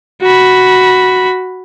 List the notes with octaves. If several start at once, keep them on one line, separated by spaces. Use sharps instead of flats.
F#4 B5